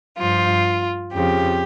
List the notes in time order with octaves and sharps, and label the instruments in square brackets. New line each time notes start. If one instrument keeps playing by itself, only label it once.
[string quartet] G2 F3 F4
F2 C#3 F3 G4